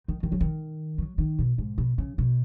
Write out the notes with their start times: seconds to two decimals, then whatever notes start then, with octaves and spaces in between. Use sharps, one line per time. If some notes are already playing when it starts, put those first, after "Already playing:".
0.08 D#3
0.23 D#3
0.32 F#3
0.40 D#3
0.98 F#3
1.18 D#3
1.38 B2
1.58 G#2
1.78 B2
1.98 C#3
2.18 B2